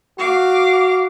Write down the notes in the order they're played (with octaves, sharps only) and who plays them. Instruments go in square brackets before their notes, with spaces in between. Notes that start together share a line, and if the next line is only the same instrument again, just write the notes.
[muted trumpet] F#4 [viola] F5 D6